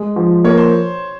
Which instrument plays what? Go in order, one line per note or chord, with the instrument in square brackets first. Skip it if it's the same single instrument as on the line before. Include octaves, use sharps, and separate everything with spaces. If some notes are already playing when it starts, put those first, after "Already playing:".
Already playing: [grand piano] G#3
F3
[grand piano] A#3 [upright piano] C#5
[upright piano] C5